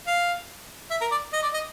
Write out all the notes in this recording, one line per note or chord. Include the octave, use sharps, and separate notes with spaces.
F5
E5
A#4
D5
D#5
D5
D#5